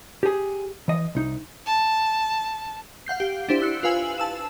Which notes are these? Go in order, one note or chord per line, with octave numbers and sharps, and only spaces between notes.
G4 G#4
E3 D#5
C2 D#4
A5
F5 F#5 G6 C7
G4
D4 E4 G4 C5
E6 F#6 C#7
F4 B4 F5 G#5 E6 F#7
A5 E6 E7